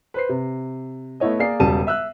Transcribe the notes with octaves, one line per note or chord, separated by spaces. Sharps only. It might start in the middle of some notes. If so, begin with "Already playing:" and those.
B4 C5 C7
C3
A3 B3 E4 C#5 D#5
A#3 G#4 D5 C7
E1 C#3 G3 A5 D#7
E5 E6 F#6